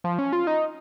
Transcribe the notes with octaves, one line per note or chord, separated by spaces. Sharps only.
F3
C#4
F4
D#4